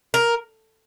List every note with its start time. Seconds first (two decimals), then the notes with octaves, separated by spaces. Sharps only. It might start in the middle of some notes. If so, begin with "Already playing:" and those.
0.14 A#4